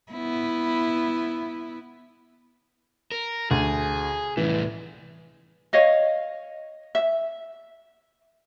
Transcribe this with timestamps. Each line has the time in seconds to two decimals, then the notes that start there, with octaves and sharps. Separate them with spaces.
0.12 B3 E4
3.12 A#4
3.51 D2 G#4
4.37 C2 A2 E3
5.73 C#5 D#5 F5
6.95 E5